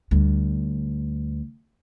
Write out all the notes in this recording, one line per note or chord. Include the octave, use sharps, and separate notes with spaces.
D2 G3